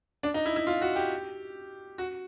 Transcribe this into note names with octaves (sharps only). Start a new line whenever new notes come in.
D4
D#4
E4
E4
F4
F#4
G4
F#4